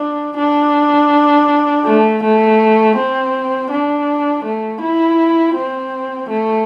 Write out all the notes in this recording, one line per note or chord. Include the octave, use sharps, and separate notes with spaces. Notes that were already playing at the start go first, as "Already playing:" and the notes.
Already playing: D4
D4
A3
A3
C4
D4
A3
E4
C4
A3